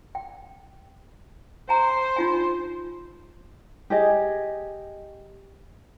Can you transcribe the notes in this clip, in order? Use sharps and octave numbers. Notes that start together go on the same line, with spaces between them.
G5
C5 G#5 A#5
D#4 F4 G#5
G4 G#4 D#5